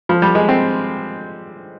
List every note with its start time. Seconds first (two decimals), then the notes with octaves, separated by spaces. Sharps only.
0.09 F3
0.22 G3
0.35 G#3
0.49 C4